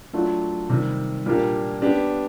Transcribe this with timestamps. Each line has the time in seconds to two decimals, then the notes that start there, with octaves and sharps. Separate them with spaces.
0.13 F#3 A3 D4 F4
0.69 C3 D#3 G3
1.26 A#2 G3 A#3 D4 G4
1.82 B3 D4 G4